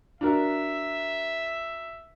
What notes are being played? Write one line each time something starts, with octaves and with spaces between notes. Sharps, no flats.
D4 F#4 A#4 E5